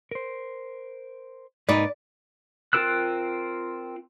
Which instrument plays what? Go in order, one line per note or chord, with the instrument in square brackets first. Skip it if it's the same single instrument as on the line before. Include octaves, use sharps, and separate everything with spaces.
[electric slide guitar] A#4 C5
[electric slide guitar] G#2 A#3 A#4 [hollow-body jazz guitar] D#4 B4 [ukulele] D5
[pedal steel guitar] C4 F4 A#4 E6 F#6